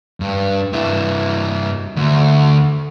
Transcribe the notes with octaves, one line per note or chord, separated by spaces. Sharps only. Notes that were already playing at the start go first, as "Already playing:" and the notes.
G2
G2 E4
D2